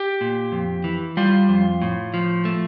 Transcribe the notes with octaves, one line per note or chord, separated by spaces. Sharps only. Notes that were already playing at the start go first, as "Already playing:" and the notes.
Already playing: G4
A#2
F2
E3
G3 F4
F2
A2
F3
A3